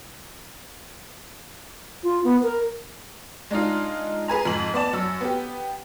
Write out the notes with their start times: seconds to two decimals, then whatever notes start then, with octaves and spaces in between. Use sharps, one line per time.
2.03 F4
2.24 B3
2.43 A#4
3.51 G#3 D4 D#4 F4
4.28 G#4 B4 G#5 A#5
4.45 F2 G#2 F#7
4.74 B3 D5 A5
4.93 F#2 E6
5.21 B3 G4